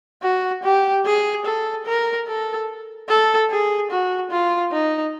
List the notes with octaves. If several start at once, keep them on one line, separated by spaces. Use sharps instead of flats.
F#4
G4
G#4
A4
A#4
A4
A4
G#4
F#4
F4
D#4